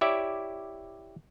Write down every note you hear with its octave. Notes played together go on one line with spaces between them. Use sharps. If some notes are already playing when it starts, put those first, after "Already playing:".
E4 G4 C#5 D5 E5